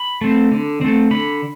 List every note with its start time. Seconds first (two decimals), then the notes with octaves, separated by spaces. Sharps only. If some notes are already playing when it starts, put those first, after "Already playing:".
Already playing: B5
0.21 A3 C4
0.52 D3
0.81 A3 C4
1.11 D3 B5